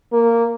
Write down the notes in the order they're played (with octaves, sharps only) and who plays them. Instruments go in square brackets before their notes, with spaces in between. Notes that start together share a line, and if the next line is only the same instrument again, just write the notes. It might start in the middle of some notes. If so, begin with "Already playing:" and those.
[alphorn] A#3